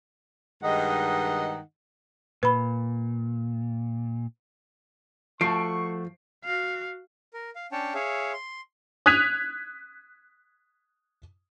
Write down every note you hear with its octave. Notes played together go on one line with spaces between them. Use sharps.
G2 D#3 G#3 D#4 D#5 F#5
A#2 B4 B5
F3 A3 F#4 C#6 C7 D7
F#4 F5
A#4
F5
C#4 D4 C#5 G5 A5
G#4 C#5 E5 F5
C6
D#6 F#6 G#6 B6 D#7 F7